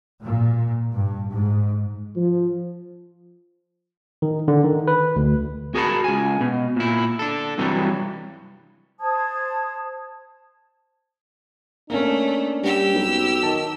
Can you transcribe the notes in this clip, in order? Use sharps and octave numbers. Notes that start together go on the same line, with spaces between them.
A#2
G2
G#2
F3
D#3
D3
D#3
B4
D2
F#4 G#4 A#4 D5 A5 B5
C#2 G#5
B2
A#2 E4
D4 A4
G2 C3 E3 F#3 G3
C5 A5 D#6 G#6
A3 A#3 C#4 D4
G2 G4 E6
B1
D#3 A5